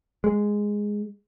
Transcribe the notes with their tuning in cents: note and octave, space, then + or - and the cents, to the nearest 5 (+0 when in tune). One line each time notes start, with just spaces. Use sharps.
G#3 -5